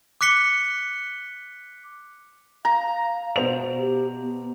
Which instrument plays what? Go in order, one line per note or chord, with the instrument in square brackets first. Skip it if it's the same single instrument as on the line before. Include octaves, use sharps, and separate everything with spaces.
[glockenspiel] D6 F#6 B6 C#7 G7
[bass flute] F5 [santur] A#5
[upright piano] B2 C5 F7
[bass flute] G4
B3